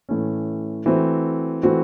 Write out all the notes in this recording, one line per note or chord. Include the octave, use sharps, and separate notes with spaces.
A2 E3 A3 C#4
E3 A3 C4 F#4
E3 A3 C4 F#4